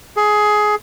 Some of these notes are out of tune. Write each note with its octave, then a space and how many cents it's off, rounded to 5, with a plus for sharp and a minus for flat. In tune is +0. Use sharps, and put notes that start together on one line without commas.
G#4 +15